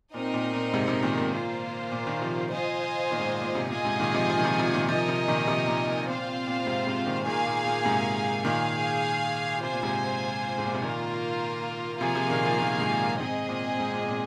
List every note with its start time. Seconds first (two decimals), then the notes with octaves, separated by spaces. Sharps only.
0.14 A#2 C4 D#4 A#4 D#5
0.34 A#2
0.54 A#2
0.73 G#2 C3
0.88 G#2 C3
1.02 A#2 D#3
1.18 A#2
1.32 A#3 F4 C5
1.92 A#2
2.07 A#2 D#3
2.22 C3 F3
2.51 F4 C5 D#5 G#5
3.11 A#2 D#3
3.20 G#2
3.26 A#2
3.41 A#2
3.55 G#2 C3
3.70 A#2 F4 G#4 D#5 G#5
3.85 G#2 C3
4.00 A#2 D#3
4.14 C3 F3
4.30 C3 F3
4.39 D#3
4.44 C3 F3
4.59 C3 F3
4.73 A#2 D#3
4.88 C3 F3 D#4 A#4 D#5 G#5
5.08 C3 F3
5.28 A#2 D#3
5.47 C3 F3
5.68 A#2 D#3
5.88 A#2
6.07 A#2 C4 F4 C5 F5
6.47 A#2
6.62 A#2
6.66 G#2 C3
6.87 G#2 C3
7.06 A#2 D#3
7.26 A#2 D#3 A#3 G#4 F5 G#5
7.46 A#2
7.65 A#2
7.85 G#2 C3
8.45 A#2 D#3 G#4 F5 G#5
9.63 C3 F4 C5 G#5
9.73 A#2
9.83 G#2 C3
10.58 G#2
10.66 A#2
10.74 C3
10.82 A#2 D#3 A#3 F4 A#4
12.00 C3 F3 A#3 F4 G#4 F5 G#5
12.15 C3 F3
12.30 A#2 D#3
12.45 C3 F3
12.60 A#2 D#3
12.75 D#3
12.80 G#2 C3
13.00 A#2
13.20 G#2 C4 G#4 D#5 G#5
13.49 A#2
13.79 G#2
13.94 A#2
14.08 A#2